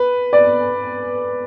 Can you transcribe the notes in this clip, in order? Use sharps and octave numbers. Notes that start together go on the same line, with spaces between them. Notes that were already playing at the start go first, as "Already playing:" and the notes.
Already playing: B4
D5